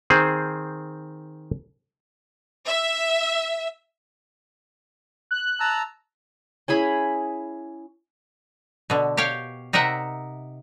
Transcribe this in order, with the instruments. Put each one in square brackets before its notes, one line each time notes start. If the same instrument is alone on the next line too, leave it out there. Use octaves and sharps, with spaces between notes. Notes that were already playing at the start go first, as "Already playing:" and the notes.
[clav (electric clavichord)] D#3 C4 G#4 C5
[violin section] E5
[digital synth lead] F#6
[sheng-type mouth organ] A5 A#5 E6
[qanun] C#4 E4 G#4 B5
[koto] B2 D3
G4 C#5 F5 G5
C3 D#4 A#4 E5 F#5